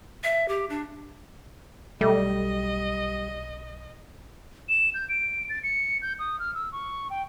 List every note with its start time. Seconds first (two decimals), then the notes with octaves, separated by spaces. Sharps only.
0.24 E5
0.48 G4
0.70 D4
2.01 B1 G3 A3 D#5
4.69 E7
4.94 G6
5.09 D7
5.50 A6
5.63 C#7
6.02 G6
6.19 D#6
6.39 F6
6.55 E6
6.72 C#6
7.10 G5